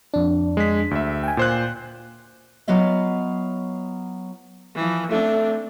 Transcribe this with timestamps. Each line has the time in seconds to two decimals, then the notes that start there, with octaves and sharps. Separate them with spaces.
0.14 F2 D4
0.57 G#3 B6
0.91 D2 E5
1.23 G5 G#5
1.37 A#2 C5 F#6
2.68 F#3 B3 F4 D#5 E5
4.75 E3 F3
5.11 A3 C4 D4